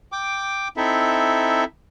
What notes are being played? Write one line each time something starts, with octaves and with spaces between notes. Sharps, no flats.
G5 D6
C4 D#4 E4 A4 E5